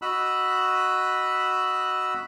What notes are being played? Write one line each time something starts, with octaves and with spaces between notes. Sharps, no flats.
F#4 D#5 B5 E6 F#6